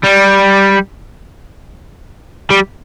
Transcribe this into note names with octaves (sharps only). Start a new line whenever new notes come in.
G3
G3